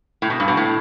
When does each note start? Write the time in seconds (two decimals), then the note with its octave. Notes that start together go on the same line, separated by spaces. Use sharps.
0.22 A2
0.30 B2
0.40 G2
0.48 B2
0.57 A2